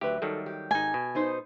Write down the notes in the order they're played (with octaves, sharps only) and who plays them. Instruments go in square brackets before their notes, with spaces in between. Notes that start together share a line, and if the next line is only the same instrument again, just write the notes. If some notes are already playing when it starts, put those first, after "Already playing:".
[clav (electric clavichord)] D2 G4 [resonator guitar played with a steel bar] F#3 B4 E5
[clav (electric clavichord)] D#3 F#3 G3 [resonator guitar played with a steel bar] A4
[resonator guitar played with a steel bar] G4
[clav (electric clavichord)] G#1 D#4 [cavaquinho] G#5
[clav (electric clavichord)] B2
[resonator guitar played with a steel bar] B3 D#4 C5